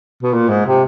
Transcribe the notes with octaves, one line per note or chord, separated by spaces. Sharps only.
B2
A#2
G#2
C3